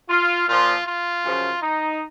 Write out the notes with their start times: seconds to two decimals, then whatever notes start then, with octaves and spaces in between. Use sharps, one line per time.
0.09 F4
0.47 A#2 F3 F4
0.86 F4
1.23 F#2 C#3 F3
1.61 D#4